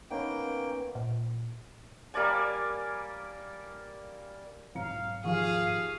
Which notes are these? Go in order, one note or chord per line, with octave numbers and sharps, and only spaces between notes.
D#3 A#3 B3 C#4 G5
A#2
G3 A#3 D5 G#5
B1 G#2 B2 C4 F5 A#5 C#7
D#2 F3 G#4 F5 C#6